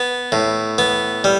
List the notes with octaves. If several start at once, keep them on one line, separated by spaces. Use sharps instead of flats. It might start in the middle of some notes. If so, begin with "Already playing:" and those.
Already playing: B3
A2
B3
G3